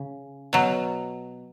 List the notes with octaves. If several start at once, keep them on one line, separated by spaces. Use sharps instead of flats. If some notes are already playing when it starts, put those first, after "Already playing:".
Already playing: C#3
B2 F#3